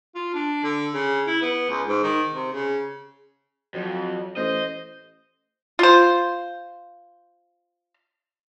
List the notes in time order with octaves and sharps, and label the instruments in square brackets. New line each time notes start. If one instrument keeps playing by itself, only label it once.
[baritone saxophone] F4
D4
D3
C#3
E4
B3
C#2
G#2
D#3
C3
C#3
[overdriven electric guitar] F2 [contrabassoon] F#3
[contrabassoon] A1 [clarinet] C5 [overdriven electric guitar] D#5
[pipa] F4 C5